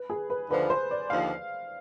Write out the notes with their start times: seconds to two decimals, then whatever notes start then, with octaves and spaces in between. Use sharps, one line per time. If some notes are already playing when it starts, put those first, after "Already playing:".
Already playing: B4
0.10 G#4
0.30 B4
0.50 D#2 D3 F3 B4
0.70 C5
0.91 D5
1.10 D#2 D3 F3 F5